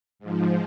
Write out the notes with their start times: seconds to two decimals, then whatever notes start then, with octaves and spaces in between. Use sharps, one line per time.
0.19 G#2 F3